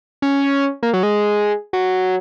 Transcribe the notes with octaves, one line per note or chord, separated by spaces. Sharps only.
C#4
A#3
F#3
G#3
F#3